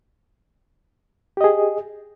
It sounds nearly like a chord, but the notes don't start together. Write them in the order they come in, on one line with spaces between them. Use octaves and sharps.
G4 D#5 G#4